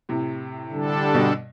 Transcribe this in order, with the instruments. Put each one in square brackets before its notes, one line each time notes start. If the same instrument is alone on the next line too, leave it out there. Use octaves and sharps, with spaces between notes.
[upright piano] A2 C3
[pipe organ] D3 G3 D4 A4
[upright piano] G2 B2